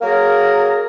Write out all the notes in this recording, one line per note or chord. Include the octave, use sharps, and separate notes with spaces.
F#3 A#3 G#4 A#4